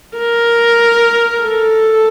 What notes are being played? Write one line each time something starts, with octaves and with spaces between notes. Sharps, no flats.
A#4
A4